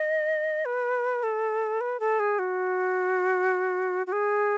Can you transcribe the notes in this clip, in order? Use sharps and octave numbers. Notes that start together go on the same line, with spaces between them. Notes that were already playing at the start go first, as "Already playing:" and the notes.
Already playing: D#5
B4
A4
B4
A4
G#4
F#4
F#4
G#4